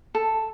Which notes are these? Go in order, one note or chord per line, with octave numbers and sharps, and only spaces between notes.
A4